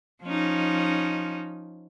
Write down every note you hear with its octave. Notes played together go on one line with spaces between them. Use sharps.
F3 C#4 D#4